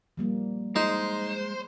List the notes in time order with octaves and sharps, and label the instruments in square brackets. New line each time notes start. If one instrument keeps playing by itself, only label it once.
[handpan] F3 G3 A#3
[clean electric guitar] G#3 [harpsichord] D#4 [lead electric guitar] C5